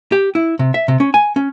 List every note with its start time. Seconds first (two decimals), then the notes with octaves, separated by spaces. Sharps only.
0.12 G4
0.35 E4
0.59 C3
0.74 E5
0.88 C3
1.00 C#4
1.14 G#5
1.36 C#4